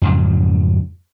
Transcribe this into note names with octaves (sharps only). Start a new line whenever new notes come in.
F2 G#2 C#3 F#3